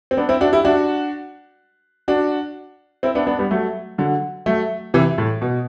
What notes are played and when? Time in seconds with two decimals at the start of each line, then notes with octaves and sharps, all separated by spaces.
0.11 C4
0.17 B3 D4
0.29 C4 E4
0.41 D4 F#4
0.53 E4 G4
0.65 D4 F#4
2.08 D4 F#4
3.03 C4 E4
3.15 B3 D4
3.27 B3 D4
3.39 G3 B3
3.51 F#3 A3
3.98 D3 F#3
4.46 F#3 A3
4.94 C3 E3
5.18 A2
5.42 B2